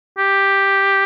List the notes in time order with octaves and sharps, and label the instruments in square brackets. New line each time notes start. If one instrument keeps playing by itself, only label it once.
[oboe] G4